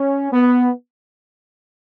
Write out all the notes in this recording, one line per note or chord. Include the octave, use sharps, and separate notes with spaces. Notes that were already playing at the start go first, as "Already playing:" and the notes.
Already playing: C#4
B3